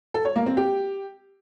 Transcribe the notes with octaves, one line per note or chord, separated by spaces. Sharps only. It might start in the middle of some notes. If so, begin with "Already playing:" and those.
A4
C#5
A#3
C4
G4